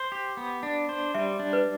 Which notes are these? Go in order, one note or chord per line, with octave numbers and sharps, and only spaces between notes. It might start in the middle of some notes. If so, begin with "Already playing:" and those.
Already playing: C5
G4
B3
D4
C5
G3 E5
D4
B4